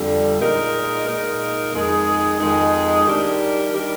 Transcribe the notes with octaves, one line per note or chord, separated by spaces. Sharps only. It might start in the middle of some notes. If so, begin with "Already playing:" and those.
Already playing: F2 D3 G3
A#2 G#3 D#4 A#4
A#2 G#3 D#4 A#4
F2 D#3 G#3 D#4 G#4
F2 D#3 G#3 D#4 G#4
D#3 G3 D4 G4 A#4
D#3 G3 D4 G4 A#4